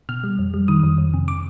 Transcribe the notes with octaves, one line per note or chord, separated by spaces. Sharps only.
B2 F6
G3
F2
G3
D#3 D#6
F2
F2
C3
D6